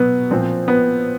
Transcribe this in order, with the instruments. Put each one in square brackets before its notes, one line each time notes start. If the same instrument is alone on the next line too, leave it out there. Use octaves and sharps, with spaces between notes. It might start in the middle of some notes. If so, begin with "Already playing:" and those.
Already playing: [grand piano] B2 F#3 B3
A#2 F3 C4
B3